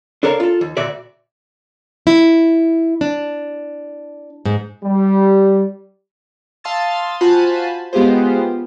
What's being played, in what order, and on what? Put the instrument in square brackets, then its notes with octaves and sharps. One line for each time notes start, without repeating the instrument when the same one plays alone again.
[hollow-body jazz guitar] D4 A4 A#4 C#5 D#5 F5
F4 A4
D#2
D2 A#2 F#4 D5 E5
[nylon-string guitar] E4
D4
G#2
[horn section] G3
[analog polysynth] F5 A5 C6 D#6 E6 A6
F4 F#4 C5 G#5 A5 B5
G#3 B3 F4 G4 G#4 C5